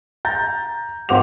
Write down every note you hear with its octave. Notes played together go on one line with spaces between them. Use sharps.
A#5 G6 A6
G#1 C4 F#5 D6 F7